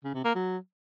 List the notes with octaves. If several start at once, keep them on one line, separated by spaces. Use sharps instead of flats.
C#3
C3
A#3
F#3